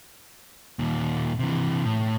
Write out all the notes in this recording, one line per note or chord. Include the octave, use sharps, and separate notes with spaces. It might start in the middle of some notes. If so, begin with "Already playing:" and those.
D#2 A#2
C3 E3
A2